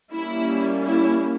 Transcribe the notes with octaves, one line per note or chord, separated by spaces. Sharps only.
G3 A#3 C#4 E4
E4